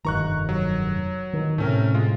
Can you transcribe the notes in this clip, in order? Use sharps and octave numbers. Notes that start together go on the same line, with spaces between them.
F1 G2 D#3 A#5 C#6 F#6
F#3
D#3
A2 C3 A3 C#4 A#4
G#3 F4